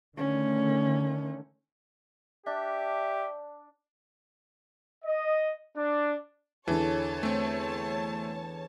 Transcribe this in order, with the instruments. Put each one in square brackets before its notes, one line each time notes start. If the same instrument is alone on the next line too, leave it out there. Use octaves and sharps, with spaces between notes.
[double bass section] D3 D#3 A3 [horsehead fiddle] C#4
[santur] D4 [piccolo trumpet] G4 [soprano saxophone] E5
[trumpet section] D#5
D4
[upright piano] E2 D3 [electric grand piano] E3 [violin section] C#5 A5
[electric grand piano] A3 C4